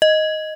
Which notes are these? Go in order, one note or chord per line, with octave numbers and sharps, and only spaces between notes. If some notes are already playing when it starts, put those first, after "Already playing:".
D#5